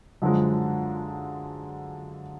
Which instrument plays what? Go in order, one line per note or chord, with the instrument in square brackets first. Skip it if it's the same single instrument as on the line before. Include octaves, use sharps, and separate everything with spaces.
[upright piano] F#2 D3 F3 G#3